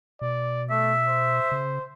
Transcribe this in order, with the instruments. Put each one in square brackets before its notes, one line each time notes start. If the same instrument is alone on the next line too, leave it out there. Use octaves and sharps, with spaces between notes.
[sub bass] B2 [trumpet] D5
[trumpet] A3 [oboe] E5
[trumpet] C5
[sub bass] C#3